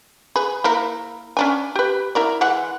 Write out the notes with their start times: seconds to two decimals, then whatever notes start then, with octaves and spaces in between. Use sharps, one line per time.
0.36 G#4 B4
0.64 A#3 E4 A#4
1.37 C#4 D4 G#5
1.76 G4 B4
2.15 E4 A#4 D5
2.41 E3 G#3 F#5